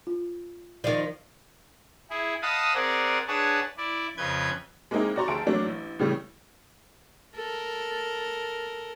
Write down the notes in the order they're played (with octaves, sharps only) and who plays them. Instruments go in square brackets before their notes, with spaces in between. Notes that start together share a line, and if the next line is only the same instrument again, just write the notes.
[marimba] F4
[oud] D#3 F3 [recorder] D5
[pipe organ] E4 G#4
D#5 F5 F#5 A5 B5 D#6
C4 G#4 A#4 D5 F#5
D4 G#4 B4 C#5 F#5 A5
E4 D5
F2 C#3 B4 G6 G#6
[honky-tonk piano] G#3 A#3 C4 D#4 E4 G#4
F#4 G4 D5 A#5 C6 C#6
D2 G#4 E5 A5 D7
F#3 A3 A#3 D4
A1
A2 C#3 G3 A3
[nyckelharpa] A4 A#4